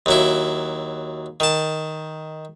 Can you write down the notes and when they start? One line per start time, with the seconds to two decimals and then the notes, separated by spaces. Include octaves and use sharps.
0.06 D#2 F#3 E4
1.40 D#3 A5